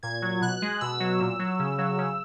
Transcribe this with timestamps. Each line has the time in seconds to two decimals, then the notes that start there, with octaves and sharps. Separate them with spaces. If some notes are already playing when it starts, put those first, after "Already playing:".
0.03 A#2 G#6
0.22 F#3
0.41 B2 F#6
0.62 G#3
0.81 B2 E6
1.00 F#3
1.20 A#2
1.39 F#3
1.59 C#3
1.78 F#3
1.98 C#3